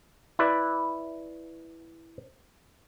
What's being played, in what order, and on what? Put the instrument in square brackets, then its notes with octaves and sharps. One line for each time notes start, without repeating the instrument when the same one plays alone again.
[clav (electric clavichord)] E4 B4 D5